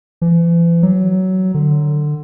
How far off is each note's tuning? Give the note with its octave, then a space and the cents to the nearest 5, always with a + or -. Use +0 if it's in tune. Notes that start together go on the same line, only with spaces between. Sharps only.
E3 +40
F#3 +15
D3 +20